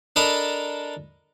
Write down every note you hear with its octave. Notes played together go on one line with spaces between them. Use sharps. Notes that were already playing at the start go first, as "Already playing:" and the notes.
D4 A4 A#4 D#5 A#5 B5